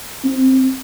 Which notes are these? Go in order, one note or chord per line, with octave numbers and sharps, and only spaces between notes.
C4